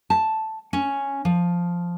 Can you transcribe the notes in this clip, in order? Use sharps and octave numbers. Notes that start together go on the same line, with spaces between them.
A5
C#4
F3